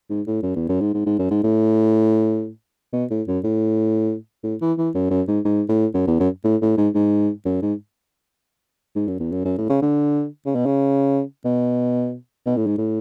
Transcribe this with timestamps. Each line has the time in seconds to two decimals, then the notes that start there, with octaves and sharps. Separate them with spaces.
0.10 G#2
0.27 A2
0.43 F#2
0.56 E2
0.69 F#2
0.81 G#2
0.94 G#2
1.06 G#2
1.19 F#2
1.31 G#2
1.44 A2
2.93 B2
3.10 A2
3.27 F#2
3.44 A2
4.44 A2
4.61 E3
4.78 E3
4.95 F#2
5.10 F#2
5.28 G#2
5.45 G#2
5.69 A2
5.94 F#2
6.07 E2
6.20 F#2
6.44 A2
6.62 A2
6.77 G#2
6.95 G#2
7.45 F#2
7.62 G#2
8.95 G#2
9.08 F#2
9.20 E2
9.32 F#2
9.45 F#2
9.58 A2
9.69 C#3
9.82 D3
10.46 C#3
10.55 B2
10.66 C#3
11.45 B2
12.46 B2
12.57 A2
12.67 G#2
12.78 A2